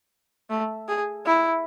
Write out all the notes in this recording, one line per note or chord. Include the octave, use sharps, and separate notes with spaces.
A3
G#4
E4